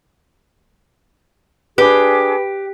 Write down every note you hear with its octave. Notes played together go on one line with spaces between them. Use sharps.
D4 G4 G#4 B4 B5 D6